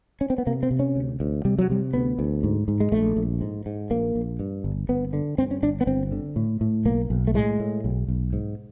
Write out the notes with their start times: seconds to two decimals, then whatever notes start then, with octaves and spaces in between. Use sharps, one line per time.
0.21 C#4
0.30 C4
0.38 B3
0.47 C3 A#3
0.63 C4
0.71 C3
0.79 C#4
0.96 D2
1.20 D2
1.45 C3 G3
1.59 F#3
1.70 C3 G3
1.94 D2 B3
2.19 D2
2.44 G#2
2.68 G#2
2.80 G#3
2.92 A#1 A3
3.17 A#1
3.41 G#2
3.66 G#2
3.91 A#1 A#3
4.16 A#1
4.40 G2
4.64 G1
4.89 G1 B3
5.13 D3
5.38 G2 C4
5.51 C#4
5.63 G1 D4
5.81 B3
5.87 G1 C4
6.12 D3
6.36 A2
6.61 A2
6.85 B1 A#3
7.10 B1
7.27 A3
7.34 A2 G#3
7.60 A2
7.84 B1
8.08 B1
8.33 G#2